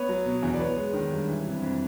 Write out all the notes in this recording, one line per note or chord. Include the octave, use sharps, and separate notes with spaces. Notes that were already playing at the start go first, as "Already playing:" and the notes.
Already playing: B3 B4 C#5
F#3
B2
E2
D5
B3 B4 C#5
G#3
D#3
G2
E3
C3
F2